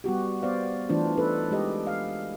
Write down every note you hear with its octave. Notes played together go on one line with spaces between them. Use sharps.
G3 B3 F#4 G4
B3 C5 D5 F5
E3 A3 D4 F4 C5
D#4 A4 B4
G#3 G4 D#5
F5